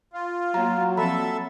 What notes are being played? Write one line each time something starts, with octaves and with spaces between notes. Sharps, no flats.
F4
F#3 A#3 F5 A#5
F3 C4 A4 E5 B5